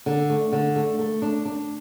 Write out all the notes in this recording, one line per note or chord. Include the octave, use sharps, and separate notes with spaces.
D3
A3
D3
A3
A3
D4
D4